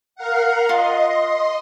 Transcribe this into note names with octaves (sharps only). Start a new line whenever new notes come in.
A#4 F5 F#5
F4 D#5 C6